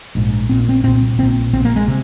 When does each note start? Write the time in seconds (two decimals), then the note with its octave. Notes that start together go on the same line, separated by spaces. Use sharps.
0.15 A#1 G#2
0.49 A#1 A#2 C4
0.69 C4
0.84 C2 A#2 C4
1.18 A#1 A#2 C4
1.53 A#1 A#2 C4
1.65 A#3
1.76 G#3
1.88 C3